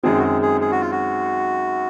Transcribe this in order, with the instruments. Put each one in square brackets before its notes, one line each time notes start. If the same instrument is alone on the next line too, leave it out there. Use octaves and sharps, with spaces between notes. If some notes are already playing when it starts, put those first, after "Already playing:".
[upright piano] F#2 D#3 G#3 C4 [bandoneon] G#4
[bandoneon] F#4
G#4
G#4
G#4
F#4
F4
F#4